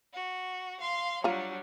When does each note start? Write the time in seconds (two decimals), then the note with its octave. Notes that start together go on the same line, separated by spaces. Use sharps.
0.14 F#4
0.81 F5 C6
1.24 F#3 G3 D4 F4 A#5